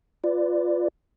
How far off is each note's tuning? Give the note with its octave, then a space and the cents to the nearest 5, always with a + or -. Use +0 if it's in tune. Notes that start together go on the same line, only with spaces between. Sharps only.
F4 +0 B4 +20 D5 +5